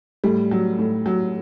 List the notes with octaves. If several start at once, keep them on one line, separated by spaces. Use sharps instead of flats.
A2 G3
F#3
A2
F#3